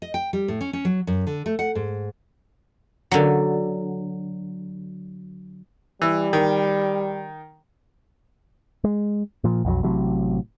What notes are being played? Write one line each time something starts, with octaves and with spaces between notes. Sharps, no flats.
D#5
G5
G3
A2
C#4
C#4
F#3
F#2
D3
A3
F#5
G#2
D3 F#3
E3 G3
D#3
G#3
A#2 F3
B1 F2 D#3 F#3
A1 A2 C3 F#3